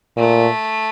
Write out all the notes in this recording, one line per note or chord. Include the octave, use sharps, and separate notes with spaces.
A#2 A3